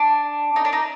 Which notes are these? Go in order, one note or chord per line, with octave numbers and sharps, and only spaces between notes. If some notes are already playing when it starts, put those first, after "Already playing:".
Already playing: D4
D#4
D4
D#4